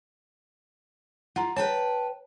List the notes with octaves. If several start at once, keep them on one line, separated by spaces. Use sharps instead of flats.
F4 F#5 A#5
B4 C#5 G5 A5